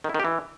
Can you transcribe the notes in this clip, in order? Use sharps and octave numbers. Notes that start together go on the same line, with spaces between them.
D#3
E4
D#3
G4
E3